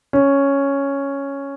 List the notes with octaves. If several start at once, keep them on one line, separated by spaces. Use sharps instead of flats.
C#4